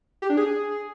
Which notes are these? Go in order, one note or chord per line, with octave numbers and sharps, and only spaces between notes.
G4
D4
G#4